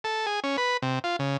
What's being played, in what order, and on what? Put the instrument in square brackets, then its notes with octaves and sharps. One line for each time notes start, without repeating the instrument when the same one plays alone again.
[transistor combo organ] A4
G#4
C#4
B4
C3
F4
C#3